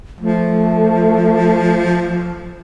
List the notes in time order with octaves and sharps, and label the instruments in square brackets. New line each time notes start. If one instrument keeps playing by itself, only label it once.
[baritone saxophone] F3 [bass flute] A3